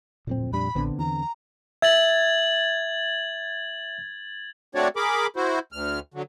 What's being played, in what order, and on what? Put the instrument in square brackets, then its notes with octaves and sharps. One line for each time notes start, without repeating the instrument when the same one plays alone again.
[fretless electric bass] D1 F2 C4 [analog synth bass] A#2
[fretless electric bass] F2 G3 D4 [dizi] B5
[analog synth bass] A#1 [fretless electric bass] D3 B3 C4
[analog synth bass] E2 [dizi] A#5
[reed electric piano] E5 [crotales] G#6 A6 F#7
[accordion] A3 C4 D4 F#4 C#5 D5
G#4 A#4 B5 D6
E4 F#4 C5
D2 F6
D3 F#3